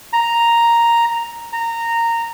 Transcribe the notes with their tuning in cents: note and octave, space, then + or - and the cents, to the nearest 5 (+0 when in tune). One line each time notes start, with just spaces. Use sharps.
A#5 +0
A#5 -15